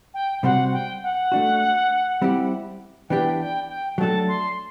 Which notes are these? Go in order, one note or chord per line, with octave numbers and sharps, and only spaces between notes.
G5
C3 G3 C4 F#4 C5 F#5
G5
F#5
A3 D4 F#4
G3 C4 E4 G4
E3 B3 D4 G4 G5
G5
G5
F#3 A3 D4 A4 A5
C6